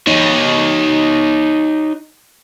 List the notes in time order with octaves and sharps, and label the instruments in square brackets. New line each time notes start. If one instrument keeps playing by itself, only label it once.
[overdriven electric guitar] D#4 C#5